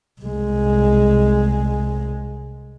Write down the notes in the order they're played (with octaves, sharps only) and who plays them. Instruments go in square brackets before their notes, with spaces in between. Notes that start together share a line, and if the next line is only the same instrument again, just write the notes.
[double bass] C2 G#3